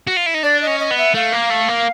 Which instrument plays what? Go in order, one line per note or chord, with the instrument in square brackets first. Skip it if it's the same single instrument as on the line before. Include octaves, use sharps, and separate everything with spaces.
[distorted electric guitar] F#4
F4
E4
D#4
[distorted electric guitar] D4 [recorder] D5
[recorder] D#5
[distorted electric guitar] C#4
[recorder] D#5
[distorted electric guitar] B3
[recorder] E5
[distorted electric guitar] A3 [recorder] F5
[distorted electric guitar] A#3
A3
A#3